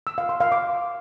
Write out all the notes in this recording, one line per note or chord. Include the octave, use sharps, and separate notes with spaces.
E6
F5
C6
F5
D6